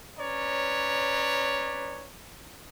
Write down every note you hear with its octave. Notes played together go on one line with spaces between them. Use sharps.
C#4 B4 C#5 D5 A#5